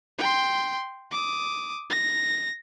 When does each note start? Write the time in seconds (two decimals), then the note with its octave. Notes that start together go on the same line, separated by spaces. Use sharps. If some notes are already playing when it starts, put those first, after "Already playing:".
0.19 G5 C6
1.11 D6 D#6
1.90 A#6